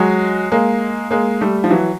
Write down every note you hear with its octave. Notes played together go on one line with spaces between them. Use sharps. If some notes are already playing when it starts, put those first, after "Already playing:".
Already playing: F#3 G#3
G#3 A#3
G#3 A#3
G3 A3
F3
E3 F#3